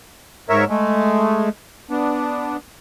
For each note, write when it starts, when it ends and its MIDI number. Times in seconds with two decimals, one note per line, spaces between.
0.49 0.65 44
0.49 0.65 70
0.49 0.65 73
0.49 0.65 76
0.69 1.49 56
0.69 1.49 57
1.90 2.57 59
1.90 2.57 62